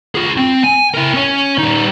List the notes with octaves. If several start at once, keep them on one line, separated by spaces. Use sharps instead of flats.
F4 G#4
C4
G#5
E4 A#4
C#4 C#5
G3 D#4